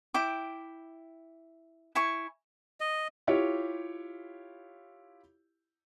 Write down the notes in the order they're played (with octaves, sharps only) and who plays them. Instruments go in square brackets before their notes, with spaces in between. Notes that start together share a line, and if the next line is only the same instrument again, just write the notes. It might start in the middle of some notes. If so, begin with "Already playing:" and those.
[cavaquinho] E4 G5 D6
E4 G#5 C#6
[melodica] D#5
[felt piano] E4 F4 G4 C#5